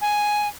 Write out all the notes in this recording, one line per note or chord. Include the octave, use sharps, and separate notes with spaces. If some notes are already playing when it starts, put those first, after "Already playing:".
G#5